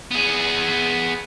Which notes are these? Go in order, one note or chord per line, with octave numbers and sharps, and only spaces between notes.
B3 G#4